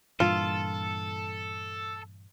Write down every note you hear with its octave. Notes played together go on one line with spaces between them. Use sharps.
G2 A#2 E3 F4 A4